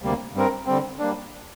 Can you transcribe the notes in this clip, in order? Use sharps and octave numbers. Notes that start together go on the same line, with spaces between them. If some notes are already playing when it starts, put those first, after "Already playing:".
D2 C3 G3 A#3
G2 G3 C4 A#4
D3 G3 C4
G3 A#3 D4